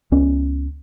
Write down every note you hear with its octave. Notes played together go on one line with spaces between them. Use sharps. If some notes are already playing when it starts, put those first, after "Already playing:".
C#2 B3 C#4